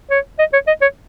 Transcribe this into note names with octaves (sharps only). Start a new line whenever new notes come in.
C#5
D#5
C#5
D#5
C#5